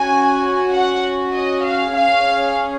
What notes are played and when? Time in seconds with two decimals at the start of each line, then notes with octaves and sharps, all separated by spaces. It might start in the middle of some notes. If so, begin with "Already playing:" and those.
Already playing: C#4 F#4 G#5
0.71 F#5
1.33 D#5
1.65 F5
1.96 C#4 G#4 F5